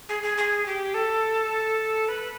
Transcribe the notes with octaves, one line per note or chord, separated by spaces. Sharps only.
G#4
G#4
G#4
G4
A4
B4